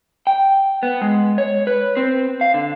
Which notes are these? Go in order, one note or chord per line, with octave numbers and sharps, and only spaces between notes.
G5
B3
G#3
C#5
B4
C4
F5
D3